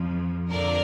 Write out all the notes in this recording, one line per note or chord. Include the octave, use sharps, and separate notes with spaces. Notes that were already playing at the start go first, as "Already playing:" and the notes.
Already playing: F2 F3
F2 D3 F3 A#4 D5